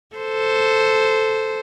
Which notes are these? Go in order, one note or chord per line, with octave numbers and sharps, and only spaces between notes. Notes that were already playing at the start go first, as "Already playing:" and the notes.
A4 C5